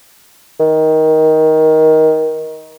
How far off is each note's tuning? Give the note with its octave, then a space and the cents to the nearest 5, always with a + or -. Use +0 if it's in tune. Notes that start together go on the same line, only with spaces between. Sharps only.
D#3 +15